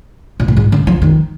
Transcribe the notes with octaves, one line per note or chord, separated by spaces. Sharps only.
A#2
A2
G#2
D3
F3
D#3